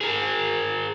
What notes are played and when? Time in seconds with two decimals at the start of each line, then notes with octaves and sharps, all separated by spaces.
0.01 G#4 A#4